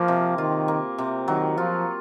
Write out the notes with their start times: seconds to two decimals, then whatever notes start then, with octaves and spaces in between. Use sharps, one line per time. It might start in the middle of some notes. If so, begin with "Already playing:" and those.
Already playing: F3 A#3
0.08 C3
0.38 D#3 F4
0.68 A#3
0.98 C3
1.28 D#3 F#3
1.58 F3 F4